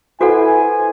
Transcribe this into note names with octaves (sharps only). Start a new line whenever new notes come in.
E4 F#4 A4 B4 C5 F#5 G#5 C6